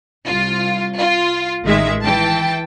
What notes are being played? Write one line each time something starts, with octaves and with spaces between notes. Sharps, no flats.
C2 F4
F4
A1 D#3 G#3 E5
E3 G5 A5